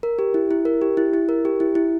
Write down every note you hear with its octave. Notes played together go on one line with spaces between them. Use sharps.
A#4
G4
E4
E4
A#4
G4
E4
E4
A#4
G4
E4
E4